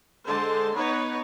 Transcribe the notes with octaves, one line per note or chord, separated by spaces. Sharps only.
D3 G#3 C5 A5 C6
B3 D#4 B4 C#5